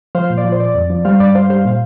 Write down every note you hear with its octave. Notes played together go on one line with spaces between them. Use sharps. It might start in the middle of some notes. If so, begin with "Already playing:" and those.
F3 C5 F5
A#2
D5
F3
C5
F3 D5
F2
F3
G3 C5 F5
G2 D5
G3 C5 F5
G3 C5 F5
A#2 F5